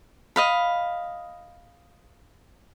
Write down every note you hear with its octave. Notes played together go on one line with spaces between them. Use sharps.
D#5 F5 B5